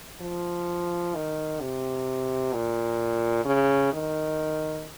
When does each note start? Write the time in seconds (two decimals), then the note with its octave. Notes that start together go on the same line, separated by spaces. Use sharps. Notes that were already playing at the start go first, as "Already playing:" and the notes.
0.21 F3
1.15 D#3
1.61 C3
2.53 A#2
3.45 C#3
3.93 D#3